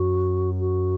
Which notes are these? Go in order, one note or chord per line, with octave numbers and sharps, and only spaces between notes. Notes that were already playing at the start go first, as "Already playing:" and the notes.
Already playing: F#2 F#4
F#4